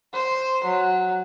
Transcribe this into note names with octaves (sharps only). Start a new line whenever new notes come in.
C5
F#3